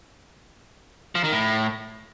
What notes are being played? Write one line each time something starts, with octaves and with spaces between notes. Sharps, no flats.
F3
D#3
A2